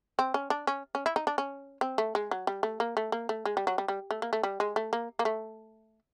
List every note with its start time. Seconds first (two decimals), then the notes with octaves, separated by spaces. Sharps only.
0.19 C4
0.34 C#4
0.50 D4
0.67 C#4
0.95 C#4
1.06 E4
1.16 D#4
1.27 D4
1.38 C#4
1.81 C4
1.98 A3
2.15 G#3
2.31 F#3
2.47 G3
2.63 A3
2.80 A#3
2.97 A3
3.12 A#3
3.29 A3
3.45 G#3
3.57 G3
3.67 F#3
3.78 G3
3.88 G3
4.11 A3
4.22 A#3
4.33 A3
4.43 G3
4.60 G#3
4.76 A3
4.93 A#3
5.19 A#3
5.25 A3